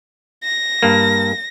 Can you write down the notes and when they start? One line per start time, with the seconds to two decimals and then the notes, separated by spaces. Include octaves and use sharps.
0.44 A#6
0.83 G2 A#3